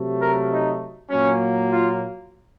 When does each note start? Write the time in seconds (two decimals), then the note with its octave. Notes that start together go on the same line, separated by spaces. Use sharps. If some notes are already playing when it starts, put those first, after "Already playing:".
Already playing: C3 F#3 A3
0.21 A#4
0.50 D#4
1.10 A#2 F#3 A#3 C#4
1.69 F4